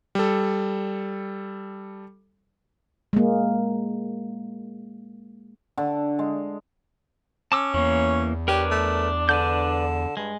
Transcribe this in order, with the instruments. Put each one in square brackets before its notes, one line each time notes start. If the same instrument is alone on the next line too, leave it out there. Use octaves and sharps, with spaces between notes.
[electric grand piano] G3 A4
[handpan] G#3 A#3
[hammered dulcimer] D3
G#3
[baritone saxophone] C#4 [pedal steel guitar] A5 D6 E6
[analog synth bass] E2 [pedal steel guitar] E3 A#3 [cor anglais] C#5
[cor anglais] D4 [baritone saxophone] G4 [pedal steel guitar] A#4 B4 C#5
[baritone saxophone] A3
[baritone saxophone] D3 [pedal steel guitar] B4 D5 G6
[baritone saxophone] G2 [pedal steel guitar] G#3